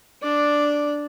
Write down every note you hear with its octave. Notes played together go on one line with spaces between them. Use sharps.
D4 D5